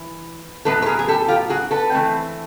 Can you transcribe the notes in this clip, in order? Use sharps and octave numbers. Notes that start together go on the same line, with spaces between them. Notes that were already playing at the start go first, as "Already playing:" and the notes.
Already playing: E3
A2 F#3 B3 A4 B4
B4
G#4 A#4
G#4
G4 A4
F4 G4
F#4 G#4
A4 B4
E3 A3 C4